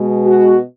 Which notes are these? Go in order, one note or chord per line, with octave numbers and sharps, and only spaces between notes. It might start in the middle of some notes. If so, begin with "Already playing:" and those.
Already playing: B2 G#3
F#4